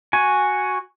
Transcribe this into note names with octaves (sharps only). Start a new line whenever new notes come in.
F#4 G#5